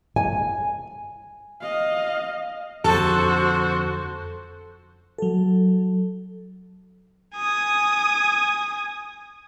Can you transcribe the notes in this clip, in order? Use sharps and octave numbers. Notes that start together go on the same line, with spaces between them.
G#5
D#5 F5
F2 D3 F#4 A4 C5
F#3 A4
G#5 D#6